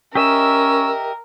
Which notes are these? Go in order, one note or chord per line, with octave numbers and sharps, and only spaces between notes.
C#4 G4 A#4 D#5 E5 E6